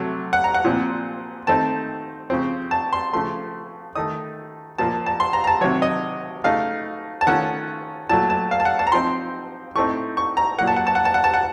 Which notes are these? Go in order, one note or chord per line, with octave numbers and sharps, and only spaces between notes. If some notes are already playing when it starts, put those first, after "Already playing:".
Already playing: C3 F#3 A3
F#5
A#5
F#5
A#2 F3 C4
D#3 A3 C4 D#4 A5
C#3 F3 C4
A5
C6
C#3 F3 A3 C6
D#3 A3 D#4 D#6
A#2 F3 A#3 A5
A5
C6
A#5
A#5
A5
C3 D#3 F#3 C#5
D#5
C#3 A3 D#4 F5
A5
D#3 A3 C#4 F4 F#5
A#2 F#3 A3 A5
A5
F5
A5
F#5
A5
A#5
F3 C4 D#4 C6
A2 A3 C4 D#4 C#6
C#6
A#5
A#2 F#3 A#3 F#5
A5
F#5
A5
F#5
A5
F#5
A5
F#5